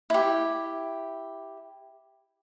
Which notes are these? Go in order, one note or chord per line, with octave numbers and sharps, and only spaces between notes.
E4 G4